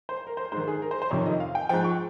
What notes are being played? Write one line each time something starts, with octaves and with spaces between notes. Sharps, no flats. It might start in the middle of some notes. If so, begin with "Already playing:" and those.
C5
A#4
C5
G#2 D#3 C5
G#4
A#4
C5
C5
F2 C3 D#3 C#5
D#5
F5
G5
G#2 F3 G5
C#6